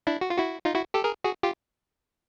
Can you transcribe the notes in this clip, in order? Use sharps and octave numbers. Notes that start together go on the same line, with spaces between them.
D4 E4
F#4
F4
E4 F#4
D#4 F4
E4 F#4
G4 A4
G#4 A#4
F#4 G#4
F4 G4